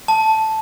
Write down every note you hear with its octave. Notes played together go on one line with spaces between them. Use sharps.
A5